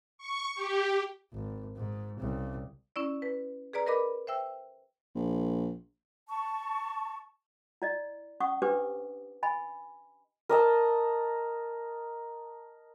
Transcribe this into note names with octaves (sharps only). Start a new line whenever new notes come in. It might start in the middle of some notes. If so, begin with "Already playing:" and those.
C#6
G4
G#1
G#2
C2 C#3
C#4 E4 D5
B4
G#4 B4 D5 A#5
A#4 B4 D#5 B5 D6
C5 E5 G5 E6
A#1
A5 C#6
E4 D5 D#5
C#4 F#5 C#6 D#6
D4 G4 B4 C5 D6
D#5 G#5 B5
A#4 D#5 A5 E6